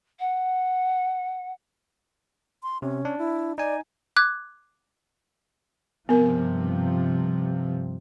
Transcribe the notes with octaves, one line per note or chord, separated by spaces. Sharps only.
F#5
C6
C3 C#4
D4
E4
D#4 D5 G#5
D6 F#6 G#6
G2 C3 F3 B3 A#4